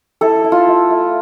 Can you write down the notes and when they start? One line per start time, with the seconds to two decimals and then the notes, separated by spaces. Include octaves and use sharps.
0.21 E4 A4
0.44 E4
0.52 F4
0.68 A3
0.90 A3